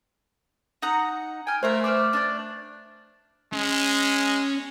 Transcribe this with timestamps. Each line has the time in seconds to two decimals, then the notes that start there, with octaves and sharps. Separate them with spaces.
0.82 D#4 F#5 A#5
1.47 G5 G#5 F6
1.63 A3 F4 A#4 C5 E5
1.84 B4 C5 D5 D6 F6
2.13 D4 D5 G6
3.53 G#3 C#4